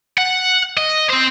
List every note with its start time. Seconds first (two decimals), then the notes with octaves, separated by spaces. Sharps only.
0.18 F#5
0.77 D#5
1.09 C4 C5